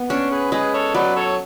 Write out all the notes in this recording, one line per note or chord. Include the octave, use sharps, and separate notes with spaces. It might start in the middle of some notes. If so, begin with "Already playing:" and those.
Already playing: B3
C#4 D4
G#4 B4
G#3 G#4 B4
A4 C#5
F#3 B4 D5
A4 C#5